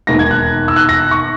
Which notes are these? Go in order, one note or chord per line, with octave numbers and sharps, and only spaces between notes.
E1 D#2 D#3 A#6
G#6
F#6
E6
F#6
A#6
C#6